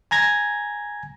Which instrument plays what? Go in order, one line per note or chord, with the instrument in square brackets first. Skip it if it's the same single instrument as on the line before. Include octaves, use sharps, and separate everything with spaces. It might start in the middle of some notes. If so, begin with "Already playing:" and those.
[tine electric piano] G#5 A#5 G#6 A#6